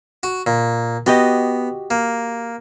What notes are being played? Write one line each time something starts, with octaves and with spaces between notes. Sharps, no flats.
F#4
A#2
B3 F#4 G4 D#5
A#3